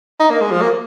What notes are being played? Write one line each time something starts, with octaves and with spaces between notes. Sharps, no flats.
D#4
A#3
G#3
F3
A#3